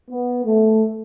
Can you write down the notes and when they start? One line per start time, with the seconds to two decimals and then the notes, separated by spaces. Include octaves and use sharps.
0.11 B3
0.45 A3